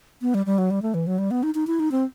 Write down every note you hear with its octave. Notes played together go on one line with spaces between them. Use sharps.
B3
G3
G3
F#3
G3
A3
E3
F#3
G3
B3
D#4
D#4
E4
D#4
C4